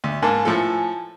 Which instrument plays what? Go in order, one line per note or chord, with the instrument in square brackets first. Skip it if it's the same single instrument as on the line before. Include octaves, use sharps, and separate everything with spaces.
[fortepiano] D2
[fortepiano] G#2 A#3 [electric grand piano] G#5 A5
[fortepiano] A2 F3 A4